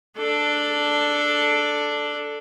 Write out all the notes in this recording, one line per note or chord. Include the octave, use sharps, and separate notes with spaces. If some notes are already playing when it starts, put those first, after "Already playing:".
D4 A4